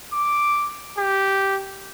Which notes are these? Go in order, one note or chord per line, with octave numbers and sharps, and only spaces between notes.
D6
G4